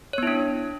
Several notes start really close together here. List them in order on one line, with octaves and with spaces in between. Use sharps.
C#5 B3 E4 D4